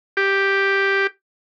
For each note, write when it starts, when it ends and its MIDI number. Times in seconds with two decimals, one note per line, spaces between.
0.17 1.07 67